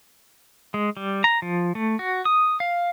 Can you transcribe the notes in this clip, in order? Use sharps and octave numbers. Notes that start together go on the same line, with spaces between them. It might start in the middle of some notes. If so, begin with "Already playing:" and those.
G#3
G3
A#5
F3
A3
F#4
D#6
F5